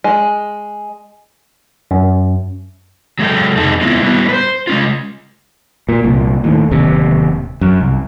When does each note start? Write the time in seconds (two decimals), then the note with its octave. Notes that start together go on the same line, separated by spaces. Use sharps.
0.04 G#3
1.91 F#2
3.19 F#3 G#3 A4 G5
3.56 F2 C3 C4 D#4 G#4 A5
3.81 G#3 B3 C4 E4 F4
4.03 G3 B3 E4 F#4
4.29 B4 C5
4.67 G#3 C#4 F4
5.89 A#2
6.04 C2 A#2
6.44 D#2 A2
6.71 D1 D#2 C3
7.61 F#2
7.80 C2